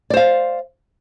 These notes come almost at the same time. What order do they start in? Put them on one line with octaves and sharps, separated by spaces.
D5 C5 F5